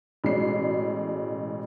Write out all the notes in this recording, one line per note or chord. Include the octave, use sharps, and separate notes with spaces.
A1 B2 G#3 C#4 D5 C7